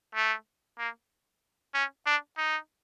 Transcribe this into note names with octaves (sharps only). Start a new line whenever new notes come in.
A3
A#3
C#4
D4
D#4